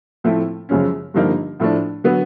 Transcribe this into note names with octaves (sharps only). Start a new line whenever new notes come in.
A2 F3 A3 C4 E4
F#2 C#3 F3 G#3 C#4
G2 D3 F3 A#3 D#4
A2 F3 A3 D4
D3 F#3 B3